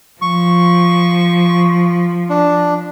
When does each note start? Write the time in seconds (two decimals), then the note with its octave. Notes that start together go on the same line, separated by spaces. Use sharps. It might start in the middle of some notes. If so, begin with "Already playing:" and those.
0.22 F3 C#6
2.30 D4